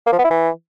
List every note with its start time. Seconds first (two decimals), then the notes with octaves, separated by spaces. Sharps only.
0.07 A#3
0.13 F3
0.19 B3
0.25 E4
0.31 E3